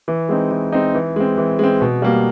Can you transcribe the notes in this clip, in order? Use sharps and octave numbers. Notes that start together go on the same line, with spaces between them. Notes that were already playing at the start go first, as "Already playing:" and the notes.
E3
G#3 C4 D#4
E3
G#3 C4 D#4
E3
G#3 C4
E3
G#3 C4
B2
G3 A#3